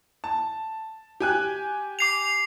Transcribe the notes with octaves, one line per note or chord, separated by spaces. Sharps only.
A5
G4 G#5 F#6
D6 C7 F7